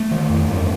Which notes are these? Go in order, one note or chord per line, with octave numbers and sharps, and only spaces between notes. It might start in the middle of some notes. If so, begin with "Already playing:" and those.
Already playing: A3
D#3
F2
G2